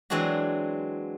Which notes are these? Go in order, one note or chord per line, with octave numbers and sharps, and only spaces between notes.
E3 F#3 G#3 C4 D4 F#4